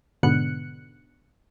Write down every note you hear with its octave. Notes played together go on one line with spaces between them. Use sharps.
G#2 B2 D3 B3 F#6 C#7